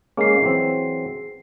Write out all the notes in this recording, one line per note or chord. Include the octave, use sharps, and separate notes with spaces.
G#3 A#3 C#4 G#4 C7
E3 F#3 C4